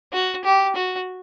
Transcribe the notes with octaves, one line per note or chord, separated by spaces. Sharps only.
F#4
G4
F#4